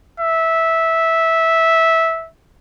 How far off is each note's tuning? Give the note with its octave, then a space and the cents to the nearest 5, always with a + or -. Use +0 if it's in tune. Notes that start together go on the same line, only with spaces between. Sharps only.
E5 -10